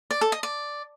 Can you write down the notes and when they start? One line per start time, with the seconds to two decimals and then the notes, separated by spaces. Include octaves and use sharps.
0.11 D5
0.21 A4
0.32 D#5
0.43 D5